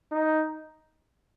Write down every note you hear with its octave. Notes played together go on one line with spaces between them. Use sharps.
D#4